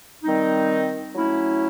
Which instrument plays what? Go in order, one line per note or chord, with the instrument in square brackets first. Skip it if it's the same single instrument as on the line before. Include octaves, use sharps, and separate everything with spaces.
[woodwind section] D#3 G3 C4 D#4
F#3 A3 C#4 E4